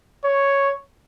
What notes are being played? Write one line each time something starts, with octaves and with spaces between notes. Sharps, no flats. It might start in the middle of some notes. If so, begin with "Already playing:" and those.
C#5